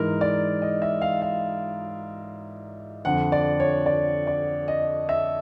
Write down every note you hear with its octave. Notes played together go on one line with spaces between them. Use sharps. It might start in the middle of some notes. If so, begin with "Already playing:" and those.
Already playing: G#2 E3 A#4
D5
D#5
E5
F5
F5
F2 D3 F#5
D5
C#5
D5
D5
D#5
E5